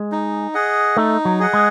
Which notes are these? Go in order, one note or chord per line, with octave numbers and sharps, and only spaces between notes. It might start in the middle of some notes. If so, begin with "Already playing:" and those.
Already playing: G#3
D#4
G#4 D#5 F#5
A3 D#4
F#3
G#4 D#5 F#5
G#3